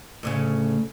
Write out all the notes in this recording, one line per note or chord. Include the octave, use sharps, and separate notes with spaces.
D2 A2 C#3